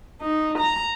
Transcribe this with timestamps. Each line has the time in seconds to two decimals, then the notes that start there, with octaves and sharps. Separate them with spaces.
0.22 D#4
0.58 A#5